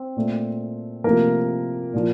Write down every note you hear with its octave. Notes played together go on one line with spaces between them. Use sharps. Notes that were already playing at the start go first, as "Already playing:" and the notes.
Already playing: C4
A#2 A3
C3 F3 A3 A#3 A#4
A#2 F3 A#3